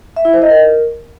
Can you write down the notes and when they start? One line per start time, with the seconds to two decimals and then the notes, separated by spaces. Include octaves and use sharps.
0.16 E5
0.25 E4
0.33 C5
0.42 D#5
0.50 A#4